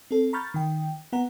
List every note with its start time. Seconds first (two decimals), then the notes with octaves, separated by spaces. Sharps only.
0.11 C4 A4
0.33 A#5 B5 C#6 F6 G6 A6
0.54 D#3 G5
1.13 B3 F#5 A#5